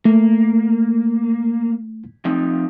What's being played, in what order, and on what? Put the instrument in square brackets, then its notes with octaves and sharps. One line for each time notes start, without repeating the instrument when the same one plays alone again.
[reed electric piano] A3 [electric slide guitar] A#3
[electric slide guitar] F3 C4 D#4